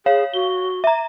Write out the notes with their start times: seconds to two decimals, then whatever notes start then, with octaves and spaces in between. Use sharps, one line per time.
0.06 G#4 C#5 F5
0.34 F#4 G7
0.84 E5 A#5